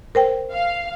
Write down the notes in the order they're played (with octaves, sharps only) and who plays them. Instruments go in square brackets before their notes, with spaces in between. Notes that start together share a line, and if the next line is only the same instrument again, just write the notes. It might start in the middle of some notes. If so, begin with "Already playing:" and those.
[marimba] A#4 C5 G5
[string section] F5